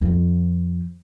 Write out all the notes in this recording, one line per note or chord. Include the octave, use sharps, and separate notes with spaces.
F2 F3